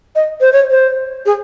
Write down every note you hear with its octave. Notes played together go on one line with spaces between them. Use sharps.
D#5
C5
C#5
C5
G#4